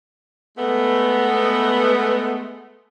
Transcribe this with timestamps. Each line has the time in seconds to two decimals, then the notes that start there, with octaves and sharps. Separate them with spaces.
0.57 G#3 A3 B3